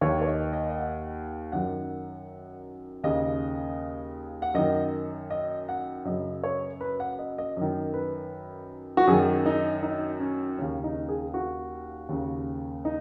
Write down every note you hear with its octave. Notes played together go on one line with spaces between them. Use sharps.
D#2 D#3 C#5
C#5
D#5
D#5
D#5
F#5
F#2 D#3 F#5
D#2 C#3 D#5
F#5
F#2 D#3 D#5
D#5
F#5
F#2 C#3 D#5
C#5
B4
F#5
D#5
D#5
F#2 D#3
B4
F#4
F#2 D#3 G#4
D#4
D#4
C#4
D#2 C#3 C#4
D#4
G#4
F#4
D#2 C#3
D#4